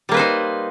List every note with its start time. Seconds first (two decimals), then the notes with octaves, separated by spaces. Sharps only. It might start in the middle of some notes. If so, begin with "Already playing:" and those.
0.09 G3
0.11 A#3
0.14 B4
0.17 C5
0.19 D#4